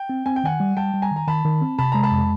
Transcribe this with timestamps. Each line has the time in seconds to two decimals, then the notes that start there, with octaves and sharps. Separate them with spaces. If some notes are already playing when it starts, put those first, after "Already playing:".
Already playing: G5
0.09 C4
0.26 C4 G#5
0.36 G5
0.44 D#3 F#5 G#5
0.60 G3
0.77 G3 G5 A5
0.94 G3
1.02 G#5 A#5
1.11 D#3
1.16 A#5
1.27 D#3 A5 B5
1.45 D#3
1.62 C4
1.78 C3 A5 B5
1.92 G#3 A#5
2.03 A5 B5
2.11 F2